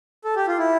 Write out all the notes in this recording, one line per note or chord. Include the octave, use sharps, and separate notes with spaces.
A4
G4
F4
E4